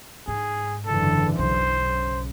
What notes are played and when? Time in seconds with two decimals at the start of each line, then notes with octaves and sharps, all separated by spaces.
0.28 G#2 G#4
0.87 F#1 D3 E3 A4
1.38 B1 C5
1.83 C#3